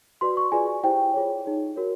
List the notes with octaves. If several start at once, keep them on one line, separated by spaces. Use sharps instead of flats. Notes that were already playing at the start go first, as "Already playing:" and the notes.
F#4 B4 D5 C6
C#6
F4 G#4 B4 D5 G#5
E4 G4 C5 G5
F4 G#4 C#5
D#4 G#4 C#5
F#4 A#4 C#5